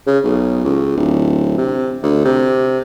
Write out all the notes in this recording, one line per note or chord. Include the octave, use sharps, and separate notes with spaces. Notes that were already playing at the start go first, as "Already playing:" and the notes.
C#3
B1
C#2
D1
C3
D2
C3